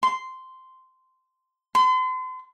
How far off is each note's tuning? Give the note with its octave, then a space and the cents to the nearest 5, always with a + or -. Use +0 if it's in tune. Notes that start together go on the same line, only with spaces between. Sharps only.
C6 -10
C6 -40